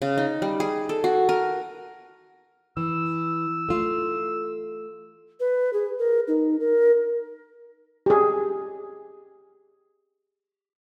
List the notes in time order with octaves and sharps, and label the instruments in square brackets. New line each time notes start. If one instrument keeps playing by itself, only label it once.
[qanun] C#3
D#4
G3
G#4
A4
F#4
A#4
[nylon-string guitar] E3 [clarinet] E6
[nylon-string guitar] A3 F4
[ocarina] B4
G#4
A#4
D#4
A#4
[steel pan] G4 G#4